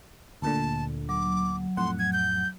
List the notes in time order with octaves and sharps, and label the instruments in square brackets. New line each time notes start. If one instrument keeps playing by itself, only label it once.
[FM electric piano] D2 A#2 D3 [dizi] A5
[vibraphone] F#3 [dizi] D6
[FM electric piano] F2 A2 F#5 [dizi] C6
[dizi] G#6
G6